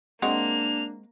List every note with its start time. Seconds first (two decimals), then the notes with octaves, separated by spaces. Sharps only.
0.22 G#3 A#3 C4 D4 F#4 F7